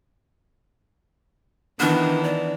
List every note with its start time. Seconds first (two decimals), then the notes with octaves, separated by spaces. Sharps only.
1.80 D#3 E3 B3 D4
2.24 D5